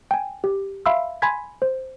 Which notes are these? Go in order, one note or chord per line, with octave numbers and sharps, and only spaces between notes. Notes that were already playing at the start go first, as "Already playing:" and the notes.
G5 G#5
G4
E5 F5 B5 C6 E6
G#5 B5 C6 G#6 B6
C5